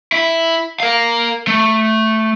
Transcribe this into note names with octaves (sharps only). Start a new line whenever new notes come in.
E4
A#4 F5
A3